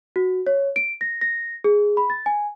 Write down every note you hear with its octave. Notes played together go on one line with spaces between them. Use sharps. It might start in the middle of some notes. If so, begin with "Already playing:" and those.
F#4
C#5
D7
A#6
A#6
G#4
B5
A6
G#5